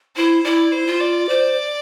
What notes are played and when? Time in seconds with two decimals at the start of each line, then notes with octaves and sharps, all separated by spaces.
0.15 E4 C5
0.44 E4 D5
0.72 C5
0.87 F4
1.00 D5
1.28 C5 D5